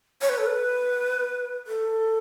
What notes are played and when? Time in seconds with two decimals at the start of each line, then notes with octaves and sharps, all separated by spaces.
0.21 C#5
0.29 B4
0.38 A4
0.46 B4
1.67 A4